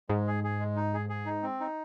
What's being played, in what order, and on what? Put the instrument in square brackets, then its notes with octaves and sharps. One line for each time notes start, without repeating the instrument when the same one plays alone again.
[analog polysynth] G#2 [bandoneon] G#3
[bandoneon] G#4
G#4
G#3
D#4
G#4
G#4
D#4
C4
D#4